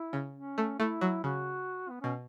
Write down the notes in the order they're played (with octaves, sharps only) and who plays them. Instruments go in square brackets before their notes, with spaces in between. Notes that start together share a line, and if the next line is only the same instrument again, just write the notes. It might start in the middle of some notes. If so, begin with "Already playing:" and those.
Already playing: [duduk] E4
[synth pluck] C#3
[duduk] C#4
[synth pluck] A3
[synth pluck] A3 [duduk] E4
[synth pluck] F#3
[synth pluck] C#3 [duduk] F#4
[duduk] B3
[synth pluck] B2 [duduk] C#4